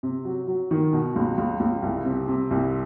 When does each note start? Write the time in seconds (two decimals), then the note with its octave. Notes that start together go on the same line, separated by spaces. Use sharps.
0.03 C3
0.25 F#3
0.47 F#3
0.71 D#3
0.93 B2
1.16 C#2
1.38 C#2
1.60 C#2
1.82 C2
2.05 C3
2.28 C3
2.51 C2